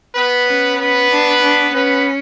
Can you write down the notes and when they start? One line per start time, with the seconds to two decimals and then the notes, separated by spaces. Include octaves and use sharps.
0.14 B3 B4
0.47 C#4
0.78 B3 B4
1.10 D4
1.42 D4
1.73 B3 C#4 B4